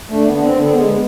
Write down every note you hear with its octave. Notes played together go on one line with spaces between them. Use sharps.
D3 A3
B3
D3
C4
D3 B3
G#3 B3
G#3